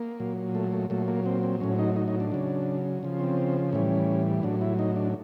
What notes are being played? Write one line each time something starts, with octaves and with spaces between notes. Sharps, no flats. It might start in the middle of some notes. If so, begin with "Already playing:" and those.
Already playing: A#3
A#2 F#3
A3
A3
A#2 F#3 A3
A#3
C4
C4
A2 F#3 C#4
D#4
D#4
D#4
D4
C#3 F#3
C#3 F3
C4
A2 E3 G3 C#4
A2 F#3 D4
E4
D#4
D4